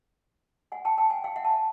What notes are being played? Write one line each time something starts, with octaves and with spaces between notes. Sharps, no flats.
F#5 G#5
G5 A5
G5 A5
F#5 G#5
F5 G5
E5 F#5
A5
F#5 G#5